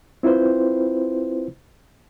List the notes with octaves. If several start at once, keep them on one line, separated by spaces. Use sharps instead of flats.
C4 E4 F4 B4 C5